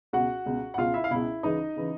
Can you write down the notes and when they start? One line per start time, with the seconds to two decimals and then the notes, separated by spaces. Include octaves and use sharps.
0.13 C#2 B2 F#4 F#5
0.46 C#2 B2
0.74 F#5
0.78 C#2 B2 F4 F5
0.94 E4 E5
1.04 F5
1.11 C#2 B2 E4 E5
1.43 C#2 C#3 E3 D#4 D#5
1.76 C#3 E3